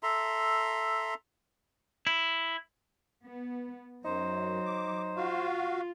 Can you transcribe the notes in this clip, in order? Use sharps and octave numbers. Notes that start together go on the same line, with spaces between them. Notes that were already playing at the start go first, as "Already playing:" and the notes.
A4 E5 A#5 C6
E4
B3
F#2 F#3 D#4 C5
D6
F4 F#4 F5